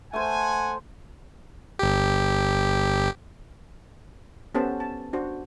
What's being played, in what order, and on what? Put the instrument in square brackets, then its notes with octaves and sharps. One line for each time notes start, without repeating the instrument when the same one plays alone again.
[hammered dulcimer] A3 C5 [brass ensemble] F#5 G#5
[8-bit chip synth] G1 G4
[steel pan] B3 C#4 G4 A4 C5 A5
A5
D4 F#4 C5